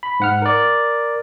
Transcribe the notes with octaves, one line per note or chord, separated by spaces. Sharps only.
B5
G#2 F#5 F6
A#4 D5